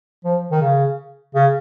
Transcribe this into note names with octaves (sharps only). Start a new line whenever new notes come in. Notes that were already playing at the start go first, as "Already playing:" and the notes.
F3
D#3
C#3
C#3